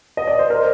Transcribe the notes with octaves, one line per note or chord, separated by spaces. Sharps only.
D#5
D5
C5
A#4